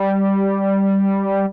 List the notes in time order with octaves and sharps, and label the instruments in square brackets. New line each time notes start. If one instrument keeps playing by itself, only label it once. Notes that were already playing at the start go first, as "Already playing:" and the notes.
Already playing: [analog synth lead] G3